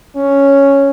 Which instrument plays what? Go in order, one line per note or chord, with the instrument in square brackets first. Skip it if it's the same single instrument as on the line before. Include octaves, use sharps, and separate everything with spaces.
[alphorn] C#4